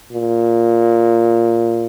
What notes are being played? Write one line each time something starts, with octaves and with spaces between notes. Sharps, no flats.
A#2